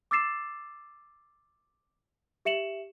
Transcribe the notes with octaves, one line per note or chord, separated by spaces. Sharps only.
D6 E6 A6 C7 E7
G4 E5 C#7 E7 F#7